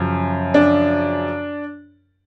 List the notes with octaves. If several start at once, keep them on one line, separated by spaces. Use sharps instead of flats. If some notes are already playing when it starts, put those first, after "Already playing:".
Already playing: F#2 C#3 F3
D4